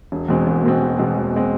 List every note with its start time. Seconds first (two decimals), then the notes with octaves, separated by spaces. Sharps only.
0.12 E1
0.29 E2 B2 G#3 C4
0.47 E1
0.64 E2 B2 G#3 C4
0.81 E1
0.99 E2 B2 G#3 C4
1.16 E1
1.34 B2 G#3 C4